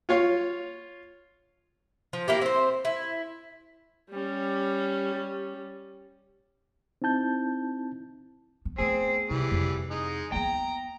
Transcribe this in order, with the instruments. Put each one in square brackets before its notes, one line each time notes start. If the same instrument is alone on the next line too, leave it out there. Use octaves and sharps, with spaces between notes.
[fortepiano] F4 C#5 F5
[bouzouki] F3
A#3 E4 G4
C4 C5
E4
[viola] G3 C#4
[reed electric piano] C4 D#4 E4 A5 G6
[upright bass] B3
[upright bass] A3 B3 [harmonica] C4 [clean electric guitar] G#4
[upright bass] C3 [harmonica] E3 G3
[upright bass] F2 C3
[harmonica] G#3 D#4
[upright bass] A#3 B3 [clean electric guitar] G5 [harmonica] A#5